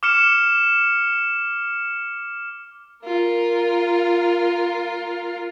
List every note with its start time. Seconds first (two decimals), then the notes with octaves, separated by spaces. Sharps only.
0.03 D6 F6 C#7 E7
3.05 F4 A#4